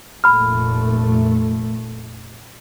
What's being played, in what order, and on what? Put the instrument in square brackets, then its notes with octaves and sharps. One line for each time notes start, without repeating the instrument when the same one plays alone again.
[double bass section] F1 A#2 A3 [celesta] B5 F6